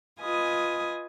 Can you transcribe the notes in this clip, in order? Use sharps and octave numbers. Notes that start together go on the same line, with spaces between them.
F4 B4 D#5 G#5 D#6